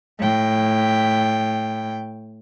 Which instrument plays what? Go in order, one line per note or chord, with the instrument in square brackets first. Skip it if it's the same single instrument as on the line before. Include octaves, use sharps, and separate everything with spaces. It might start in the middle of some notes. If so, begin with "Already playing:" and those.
[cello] A2 G5